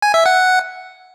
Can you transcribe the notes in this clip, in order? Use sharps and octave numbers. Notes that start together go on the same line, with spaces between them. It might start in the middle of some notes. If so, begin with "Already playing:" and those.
G#5
E5
F#5